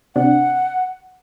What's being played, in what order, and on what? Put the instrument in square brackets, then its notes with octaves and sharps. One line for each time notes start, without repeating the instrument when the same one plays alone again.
[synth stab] C3 C4 D4 [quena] F#5